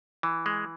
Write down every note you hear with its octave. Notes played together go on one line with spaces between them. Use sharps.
E3
G#3